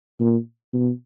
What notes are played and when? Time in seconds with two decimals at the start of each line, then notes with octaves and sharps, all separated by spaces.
0.20 A#2
0.73 B2